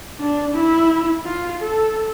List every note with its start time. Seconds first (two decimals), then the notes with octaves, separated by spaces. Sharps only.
0.20 D4
0.55 E4
1.26 F4
1.61 A4